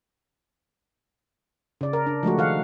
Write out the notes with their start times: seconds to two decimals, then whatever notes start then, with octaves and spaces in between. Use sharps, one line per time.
1.81 C#3 D5
1.93 A#4
2.06 D4
2.23 F3 G#3 A3 F#4
2.38 D#3 F5 F#5